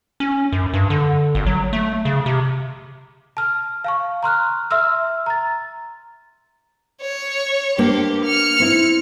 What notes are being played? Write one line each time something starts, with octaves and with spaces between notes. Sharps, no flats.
C#4
F#2
G2
D3
G#1
F#3
A3
C#3
C3
A5 F6
F5 A5 C#6
A#5 C6 F6 F#6
E5 C6 E6 F6
A#5 A6
C#5
A#3 D4 G4 C5
F6 C#7
C4 E4